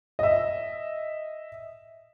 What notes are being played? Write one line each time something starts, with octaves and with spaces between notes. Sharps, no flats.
D#5 E5